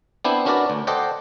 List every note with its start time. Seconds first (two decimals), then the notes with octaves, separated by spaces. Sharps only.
0.24 B3 C4 D4 E4 C5
0.46 C#4 D4 F#4 A#4 B4 D5
0.70 D2
0.87 A4 C5 D5 D#5 F#5 G5